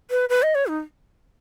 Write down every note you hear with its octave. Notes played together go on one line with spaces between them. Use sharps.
B4
B4
D#5
C#5
D#4